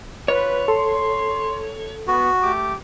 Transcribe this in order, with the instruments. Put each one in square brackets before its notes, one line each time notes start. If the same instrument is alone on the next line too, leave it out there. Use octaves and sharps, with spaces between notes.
[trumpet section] F4 B4 [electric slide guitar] C#5
[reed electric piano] A4 [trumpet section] C6
[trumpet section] B3 [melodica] F#4
[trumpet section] A3 G4 D6